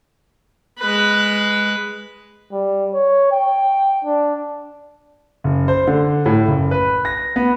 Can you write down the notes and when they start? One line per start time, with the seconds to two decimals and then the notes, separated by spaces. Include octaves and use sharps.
0.79 G#3 B4
2.52 G3
2.94 C#5
3.32 G5
4.05 D4
5.44 F#1
5.68 C5
5.87 D3
6.26 A2
6.48 F#1
6.71 B4
7.05 A#6
7.36 B3